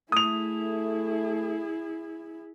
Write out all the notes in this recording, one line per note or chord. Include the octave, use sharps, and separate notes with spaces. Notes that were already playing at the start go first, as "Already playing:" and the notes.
A3 E4 G#4 D#6 F7